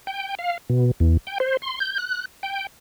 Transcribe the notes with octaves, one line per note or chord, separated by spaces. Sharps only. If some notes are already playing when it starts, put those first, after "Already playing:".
G5
F5
B2
E2
G5
C5
C6
G6
F#6
G5